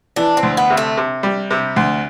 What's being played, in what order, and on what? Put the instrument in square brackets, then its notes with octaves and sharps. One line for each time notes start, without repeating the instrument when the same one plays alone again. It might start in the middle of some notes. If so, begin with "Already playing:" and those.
[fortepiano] E3 [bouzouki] D4
[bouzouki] C4
[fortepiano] D2
[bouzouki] B3
[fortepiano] C3
[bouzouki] A3
[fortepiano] C3
G3
C3
D2